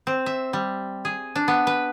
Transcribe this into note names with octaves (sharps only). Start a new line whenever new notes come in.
C4
E5
G3
G#4
D4
B3
B4